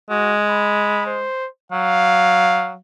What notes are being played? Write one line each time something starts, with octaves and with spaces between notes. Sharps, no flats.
G#3 F#4
B5
C5
F#3 F5